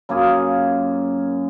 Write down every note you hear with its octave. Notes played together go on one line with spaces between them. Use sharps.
F#2 A#3 F4 G#4